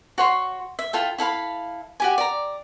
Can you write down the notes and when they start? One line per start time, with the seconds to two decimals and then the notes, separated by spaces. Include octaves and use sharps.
0.18 F#4 C#5 C6
0.79 E5
0.93 E4 F4 A4 G5
1.18 E4 A4 F5 B5
2.00 F#4 G4 G#5
2.18 D5 A#5